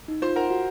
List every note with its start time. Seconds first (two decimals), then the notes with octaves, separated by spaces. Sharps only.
0.08 D#4
0.22 F4 C5 C6
0.36 A#4 F#5 A#5
0.50 F#4